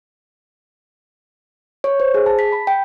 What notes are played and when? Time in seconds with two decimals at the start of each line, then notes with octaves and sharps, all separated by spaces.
1.84 C#5
2.00 C5
2.14 G#4
2.26 A5
2.39 B6
2.52 B5
2.67 G5